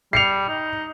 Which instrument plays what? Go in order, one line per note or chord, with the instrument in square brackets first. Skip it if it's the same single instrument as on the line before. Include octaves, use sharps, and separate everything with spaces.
[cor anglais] G3 [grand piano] C7 C#7 F7
[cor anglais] D#4